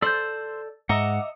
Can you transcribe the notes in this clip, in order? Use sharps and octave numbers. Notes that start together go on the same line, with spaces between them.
A4 C5 D5 E6 G6 F#7
G#2 D#5 E5 F#5 A#5 D6 D#6 C#7